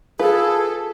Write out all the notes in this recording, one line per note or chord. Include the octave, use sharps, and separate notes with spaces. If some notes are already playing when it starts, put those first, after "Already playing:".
F4 G#4 A4 B4